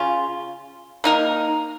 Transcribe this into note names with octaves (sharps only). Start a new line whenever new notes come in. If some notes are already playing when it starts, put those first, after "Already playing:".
Already playing: C#3 C#4 F4
A#3 D#4 A#4